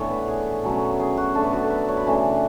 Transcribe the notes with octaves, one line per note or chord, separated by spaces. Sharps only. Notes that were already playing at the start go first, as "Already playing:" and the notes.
Already playing: A2 E3 B3 D4 C#5
B4
G#4
B2 F#3 A3 C#4
G#4
F#4
B2 A3 D4 A4
B4
F#4
A4
B4
C#5
B5
C#3 E3 A3 D4